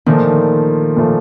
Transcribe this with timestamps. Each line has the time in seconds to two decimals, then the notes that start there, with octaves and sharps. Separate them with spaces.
0.06 A#2 D#3 F3 A3
0.97 A#2 F3 A3